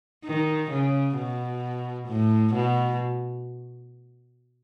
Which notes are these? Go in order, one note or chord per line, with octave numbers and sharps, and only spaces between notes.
D#3
C#3
B2
A2
B2